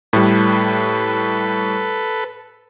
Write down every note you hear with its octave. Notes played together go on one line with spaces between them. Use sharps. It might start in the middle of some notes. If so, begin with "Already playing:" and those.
A2 G3 A4 B4